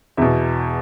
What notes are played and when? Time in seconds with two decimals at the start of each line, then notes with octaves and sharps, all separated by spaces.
0.17 E2 B2 E5